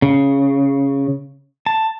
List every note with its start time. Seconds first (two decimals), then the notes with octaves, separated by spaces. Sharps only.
0.02 C#3
1.66 A5